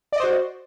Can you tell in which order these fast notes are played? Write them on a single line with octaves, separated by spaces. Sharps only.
D5 D#5 C5 F#4